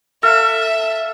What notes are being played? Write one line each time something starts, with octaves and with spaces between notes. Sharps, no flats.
A4 E5 F5